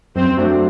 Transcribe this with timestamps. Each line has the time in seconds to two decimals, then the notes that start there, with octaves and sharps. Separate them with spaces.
0.16 F#2 C4 C5
0.37 F#3 A3 D4